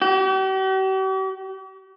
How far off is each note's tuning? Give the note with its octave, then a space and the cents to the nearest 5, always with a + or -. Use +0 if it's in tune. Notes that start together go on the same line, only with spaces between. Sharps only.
G4 -45